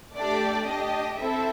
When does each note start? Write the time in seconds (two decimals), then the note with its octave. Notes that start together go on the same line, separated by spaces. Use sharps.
0.15 A3 D4 G4 D5
0.67 D4 G4 D#5
1.19 C4 E4 A4 E5